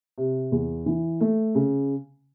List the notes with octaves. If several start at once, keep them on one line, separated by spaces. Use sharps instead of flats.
C3
E2
E3
A3
C#3